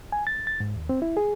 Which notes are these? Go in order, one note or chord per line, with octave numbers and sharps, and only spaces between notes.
G#5
A6
A6
G#2
D#2
C4
E4
G#4